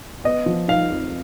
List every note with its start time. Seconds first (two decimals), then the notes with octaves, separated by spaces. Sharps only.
0.24 B3 D#5
0.46 F3
0.68 D#4 F5
0.90 F2